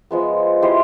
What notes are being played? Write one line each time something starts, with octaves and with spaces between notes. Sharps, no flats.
F3 G#3 B3
E4 G4 C5 D#5